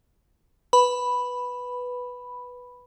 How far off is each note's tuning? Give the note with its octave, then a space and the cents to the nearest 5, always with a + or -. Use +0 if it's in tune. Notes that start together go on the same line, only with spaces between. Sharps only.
B4 +0 B5 +0